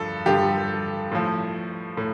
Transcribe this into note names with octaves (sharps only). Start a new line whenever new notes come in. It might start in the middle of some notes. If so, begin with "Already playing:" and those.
Already playing: G2 D3 F3 A4
G2 D3 F3 G4
A2 F3
A2